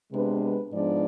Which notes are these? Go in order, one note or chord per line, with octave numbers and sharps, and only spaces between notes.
C3 G#3 B3 D4 B4
B4
G#2 F3 G#3 B3 D4 D5